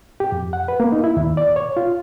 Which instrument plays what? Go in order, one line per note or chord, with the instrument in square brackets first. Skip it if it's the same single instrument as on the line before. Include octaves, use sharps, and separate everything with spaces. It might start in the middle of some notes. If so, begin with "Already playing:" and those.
[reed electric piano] G4
F2
F#5
B4
A#3
D#4
E4
D#2
D5
C#5
F4